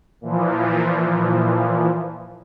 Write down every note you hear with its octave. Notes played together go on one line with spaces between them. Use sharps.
A#2 E3 F3